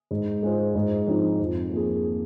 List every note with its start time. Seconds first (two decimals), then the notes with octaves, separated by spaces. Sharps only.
0.11 G#2
0.43 G#3 F4 G#4 C5
0.75 G#2
1.07 F3 C4 D#4
1.39 F2
1.71 F3 A#3 G#4